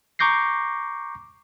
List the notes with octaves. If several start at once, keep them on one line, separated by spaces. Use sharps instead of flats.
A#5 C#6 D6 G6 A#6 C7